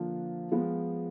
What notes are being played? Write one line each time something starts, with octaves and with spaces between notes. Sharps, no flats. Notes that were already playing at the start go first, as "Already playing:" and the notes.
Already playing: D3 F3 A#3 D4 F4
F3 G#3 B3 F4